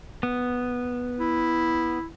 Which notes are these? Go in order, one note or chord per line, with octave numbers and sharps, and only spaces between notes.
B3
E4